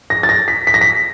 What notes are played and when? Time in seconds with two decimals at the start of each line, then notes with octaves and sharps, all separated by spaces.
0.10 A#6
0.23 A6
0.29 A#6
0.48 B6
0.67 B6
0.74 A#6
0.81 B6